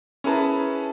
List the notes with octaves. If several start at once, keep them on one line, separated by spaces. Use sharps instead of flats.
C#4 E4 G#4 B4 A5 A#5